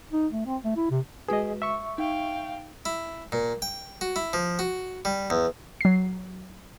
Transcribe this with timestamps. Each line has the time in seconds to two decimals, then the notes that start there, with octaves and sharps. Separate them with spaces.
0.12 D#4
0.33 A3
0.46 C4
0.64 A3
0.76 E4
0.91 C3
1.28 G#3 F#4 G#4 B4 D#5
1.62 E5 C#6
1.98 D#4 F5 G5
2.86 E4
3.32 A#2
3.62 G5
4.01 F#4
4.16 E4
4.33 F3
4.59 F#4
5.05 G3
5.30 E2
5.81 F#3 C7